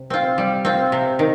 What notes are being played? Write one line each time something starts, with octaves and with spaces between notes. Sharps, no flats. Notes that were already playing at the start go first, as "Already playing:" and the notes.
Already playing: C3
C4 F4
G3
C4 F4
C3
D#3